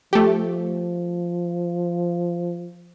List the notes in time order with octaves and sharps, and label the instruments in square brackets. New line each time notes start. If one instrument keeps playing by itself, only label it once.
[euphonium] F3 [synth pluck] A3 G4